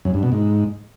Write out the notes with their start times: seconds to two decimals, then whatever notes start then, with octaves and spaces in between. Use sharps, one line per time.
0.05 F#2
0.14 G2
0.23 B2
0.32 G#2